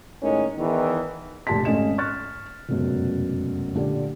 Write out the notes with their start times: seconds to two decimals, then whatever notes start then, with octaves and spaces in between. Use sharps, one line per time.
0.22 A2 D#3 G#3 A#3 C#4 D#4
0.57 E2 D#3 E3
1.47 F1 A#1 G4 A5 C6 B6
1.65 G#1 A3 C#4 D#5 E7
1.98 C#6 F6 F#6 A6
2.69 F1 C#2 F#2 B2
3.75 A#2 D3 G4